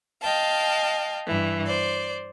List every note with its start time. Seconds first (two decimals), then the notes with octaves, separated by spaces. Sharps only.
0.22 D#5 F5 G5 A5
1.26 G2 E3
1.66 C5 D5